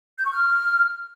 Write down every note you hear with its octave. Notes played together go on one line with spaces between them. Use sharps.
G6
C#6
F6